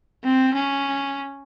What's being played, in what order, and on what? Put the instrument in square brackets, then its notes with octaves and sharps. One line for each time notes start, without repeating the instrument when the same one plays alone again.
[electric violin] C4
C#4